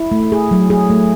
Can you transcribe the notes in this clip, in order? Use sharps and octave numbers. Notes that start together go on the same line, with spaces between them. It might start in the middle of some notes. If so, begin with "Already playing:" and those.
Already playing: E4
A3
G#4
F#3
G#4
A3